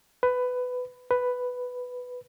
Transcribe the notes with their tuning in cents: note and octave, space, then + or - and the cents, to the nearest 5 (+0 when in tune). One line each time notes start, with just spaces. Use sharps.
B4 +15
B4 +5